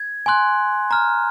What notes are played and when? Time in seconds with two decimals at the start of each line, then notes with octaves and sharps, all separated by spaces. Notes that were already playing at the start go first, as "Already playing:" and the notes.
Already playing: G#6
0.26 G#5 C6 F#6
0.91 A#5 F6